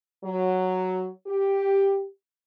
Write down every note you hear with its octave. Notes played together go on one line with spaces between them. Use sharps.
F#3
G4